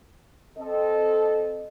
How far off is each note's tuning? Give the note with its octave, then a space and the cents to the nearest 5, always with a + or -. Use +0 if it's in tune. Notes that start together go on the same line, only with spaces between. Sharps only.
C4 +0 A4 -15 D#5 -20